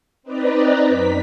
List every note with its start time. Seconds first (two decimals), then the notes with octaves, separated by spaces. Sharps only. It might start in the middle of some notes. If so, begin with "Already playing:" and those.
0.23 C4 D#4 B4 D5 A#5
0.87 F#2 B6